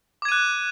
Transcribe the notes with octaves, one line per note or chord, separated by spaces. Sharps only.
D6 F#6 G#6 D#7